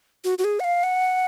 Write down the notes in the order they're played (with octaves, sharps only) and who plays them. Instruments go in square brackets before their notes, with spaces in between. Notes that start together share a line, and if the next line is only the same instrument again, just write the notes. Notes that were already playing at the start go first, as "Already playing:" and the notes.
[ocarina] F#4
F#4
G#4
F#5
F5
F#5